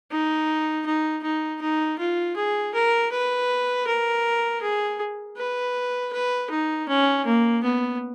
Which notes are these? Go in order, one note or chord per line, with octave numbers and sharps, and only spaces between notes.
D#4
D#4
D#4
D#4
F4
G#4
A#4
B4
A#4
G#4
B4
B4
D#4
C#4
A#3
B3